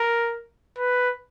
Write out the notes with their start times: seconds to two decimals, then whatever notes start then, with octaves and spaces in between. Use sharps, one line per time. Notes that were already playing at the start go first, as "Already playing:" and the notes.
Already playing: A#4
0.78 B4